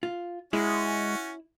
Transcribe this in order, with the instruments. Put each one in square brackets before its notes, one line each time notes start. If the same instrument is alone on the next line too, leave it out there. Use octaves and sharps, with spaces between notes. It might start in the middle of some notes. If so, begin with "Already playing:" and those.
[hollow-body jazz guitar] F4
[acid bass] G#3 [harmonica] C#4 F#4 [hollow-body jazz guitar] E4